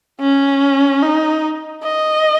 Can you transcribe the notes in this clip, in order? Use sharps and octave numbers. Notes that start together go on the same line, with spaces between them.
C#4
D#4
D#5